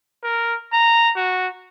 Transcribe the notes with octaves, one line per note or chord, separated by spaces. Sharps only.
A#4
A#5
F#4